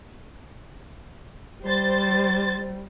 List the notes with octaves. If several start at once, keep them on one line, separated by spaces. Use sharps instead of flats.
G3 C5 A6